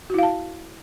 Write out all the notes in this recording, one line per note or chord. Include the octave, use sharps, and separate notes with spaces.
E4 F#4 F5 A5